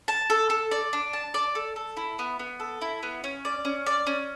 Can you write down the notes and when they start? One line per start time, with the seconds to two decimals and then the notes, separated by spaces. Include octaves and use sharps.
0.08 A5
0.30 A4
0.50 A4
0.71 D5
0.93 D4
1.13 A5
1.34 D5
1.55 A4
1.76 A4
1.97 E4
2.19 B3
2.39 B3
2.60 A4
2.81 E4
3.03 B3
3.24 C#4
3.45 D5
3.65 C#4
3.86 D5
4.07 C#4